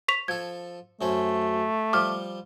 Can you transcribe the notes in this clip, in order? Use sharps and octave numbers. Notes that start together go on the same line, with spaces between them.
C#6 B6 F7
F3 A4 G#6
F#2 A3 C#4 C5
F3 G3 D6 F6